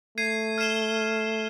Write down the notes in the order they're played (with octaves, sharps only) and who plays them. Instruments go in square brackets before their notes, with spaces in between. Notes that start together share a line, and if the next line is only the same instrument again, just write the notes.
[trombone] A3 [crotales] G#6 C7 D#7
[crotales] F6 G#6 C7 E7 G7